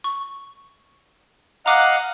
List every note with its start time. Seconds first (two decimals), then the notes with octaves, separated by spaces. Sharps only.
0.04 C#6
1.66 D#5 F5 F#5 A#5 D6 F#6